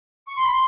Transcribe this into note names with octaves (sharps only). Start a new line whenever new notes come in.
C#6
C6
B5
C6